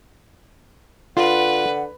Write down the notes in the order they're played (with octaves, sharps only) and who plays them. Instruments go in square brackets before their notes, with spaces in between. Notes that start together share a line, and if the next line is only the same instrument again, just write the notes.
[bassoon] D3 [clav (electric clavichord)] F4 [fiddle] B4 [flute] F#5